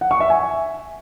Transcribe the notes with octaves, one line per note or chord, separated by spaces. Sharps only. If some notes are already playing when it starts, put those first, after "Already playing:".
F#5
C#6
E5
G#5